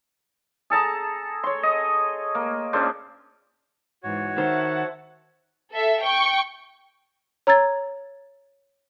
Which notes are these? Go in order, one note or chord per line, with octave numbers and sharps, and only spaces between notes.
G#4 A4 A5 A#5
C#5 C6
D#5
A#3
A#2 C#3 D4 C5
G#2 E3 F#4 C#5
D#3 C5 E5 F#5 A5
A4 E5
G5 C#6
C#5 A#5 E6 G#6 A6